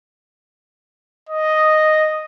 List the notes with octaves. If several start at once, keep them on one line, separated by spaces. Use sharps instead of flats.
D#5